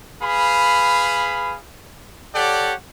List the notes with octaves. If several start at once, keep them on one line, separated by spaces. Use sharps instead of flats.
G#4 B4 F5 B5
G4 A4 C#5 D5 F#5